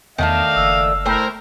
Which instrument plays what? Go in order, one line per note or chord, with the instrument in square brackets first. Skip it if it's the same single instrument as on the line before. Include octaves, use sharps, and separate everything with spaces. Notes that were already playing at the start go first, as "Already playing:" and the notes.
[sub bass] E2 [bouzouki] D#3 A3 D4 [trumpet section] D#5 F5
[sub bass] F#1 [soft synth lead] E6
[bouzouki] A3 C5 G5 [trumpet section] E4 A#4